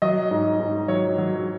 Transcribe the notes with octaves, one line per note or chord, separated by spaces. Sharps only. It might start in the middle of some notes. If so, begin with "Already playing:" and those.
F#3 D#5
G#2
G#2
F#3 C#5
F#3